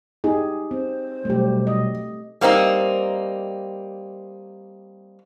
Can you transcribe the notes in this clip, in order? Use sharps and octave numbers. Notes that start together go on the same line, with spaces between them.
D#4 G4 G#4
C4 C5
B2 F#3 G3 A3 G4
D#5
G3 A#3 C4 D#4